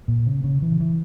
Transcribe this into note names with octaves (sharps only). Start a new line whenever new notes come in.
A#2
C#3
C#3
E3
E3